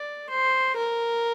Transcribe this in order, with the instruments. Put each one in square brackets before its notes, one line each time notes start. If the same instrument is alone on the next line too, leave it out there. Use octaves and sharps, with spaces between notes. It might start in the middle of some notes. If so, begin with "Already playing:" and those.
Already playing: [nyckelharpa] D5
C5
A#4